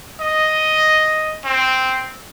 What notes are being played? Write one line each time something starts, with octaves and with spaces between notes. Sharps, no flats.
D#5
C4